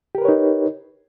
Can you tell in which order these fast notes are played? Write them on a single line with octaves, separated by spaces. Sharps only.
G4 A#4 B4 C#5 D#4